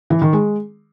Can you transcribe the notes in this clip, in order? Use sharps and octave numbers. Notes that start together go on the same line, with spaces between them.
E3
D#3
G#3